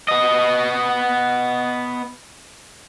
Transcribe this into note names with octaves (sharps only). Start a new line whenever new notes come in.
B3 D#5